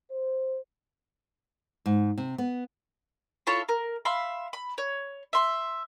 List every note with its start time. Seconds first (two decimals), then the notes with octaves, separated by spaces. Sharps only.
0.10 C5
1.86 G#2
2.18 C3
2.38 B3
3.47 E4 F4 A4 C#5
3.69 A#4
4.05 E5 F5 B5 C6
4.53 B5
4.78 C#5
5.33 E5 C6